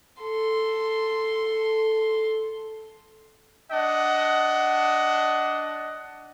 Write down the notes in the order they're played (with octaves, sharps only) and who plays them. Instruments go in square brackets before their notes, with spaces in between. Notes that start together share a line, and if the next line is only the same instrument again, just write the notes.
[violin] A4 C6
[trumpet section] D4 D#5 F#5